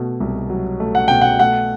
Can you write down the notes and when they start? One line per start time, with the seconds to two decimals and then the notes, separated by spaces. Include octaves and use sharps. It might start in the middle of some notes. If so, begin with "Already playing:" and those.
Already playing: B2 A3
0.20 C2
0.50 F#3
0.80 A3
0.95 F#5
1.08 B2 G5
1.21 F#5
1.39 A3 F#5